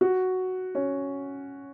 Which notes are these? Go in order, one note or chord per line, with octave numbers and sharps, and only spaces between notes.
F#4
C#4